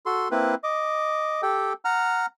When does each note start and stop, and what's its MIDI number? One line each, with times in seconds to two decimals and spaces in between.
0.06 0.28 66
0.06 0.28 69
0.06 0.28 84
0.31 0.55 58
0.31 0.55 60
0.31 0.55 64
0.31 0.55 71
0.64 1.41 75
0.64 1.41 86
1.42 1.73 67
1.42 1.73 69
1.42 1.73 79
1.85 2.26 78
1.85 2.26 82
1.85 2.26 89